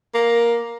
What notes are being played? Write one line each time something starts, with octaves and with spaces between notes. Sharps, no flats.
A#3